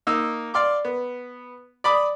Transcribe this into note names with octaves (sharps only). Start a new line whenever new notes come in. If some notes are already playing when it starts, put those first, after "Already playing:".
A#3 D#4 E6
D5 F5 C6 D6
B3
D5 B5 D6 D#6